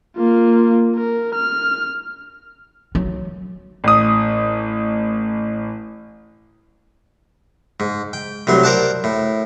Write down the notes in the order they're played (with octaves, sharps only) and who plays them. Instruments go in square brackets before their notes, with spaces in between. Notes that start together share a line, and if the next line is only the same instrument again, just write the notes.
[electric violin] A#3 F4
A#4
F6
[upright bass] F#3
[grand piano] A1 D#6
[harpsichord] G#2
G5
C2 A2 F#3 C6
A#4 C5 D5 F#5 A5
A2